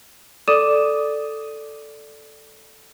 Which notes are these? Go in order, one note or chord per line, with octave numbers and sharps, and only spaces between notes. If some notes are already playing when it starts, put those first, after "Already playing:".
A4 D5 D6 D#6 D#7 E7